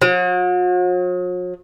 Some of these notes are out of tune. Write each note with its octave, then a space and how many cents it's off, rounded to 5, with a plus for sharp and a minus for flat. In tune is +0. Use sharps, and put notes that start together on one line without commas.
F#3 -45